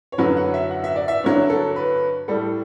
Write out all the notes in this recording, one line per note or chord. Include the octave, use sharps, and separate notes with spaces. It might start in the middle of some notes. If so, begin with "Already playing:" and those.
C#5
F#2 D3 F#3 B4
F#5
E5
F#5
E5
D5
E5
G2 D3 F#3 C#5
A4
B4
A2 G3 A4